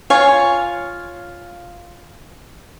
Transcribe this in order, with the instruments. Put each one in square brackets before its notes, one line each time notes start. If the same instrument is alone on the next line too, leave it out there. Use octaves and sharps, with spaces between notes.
[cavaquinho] F4 C#5 F5 G#5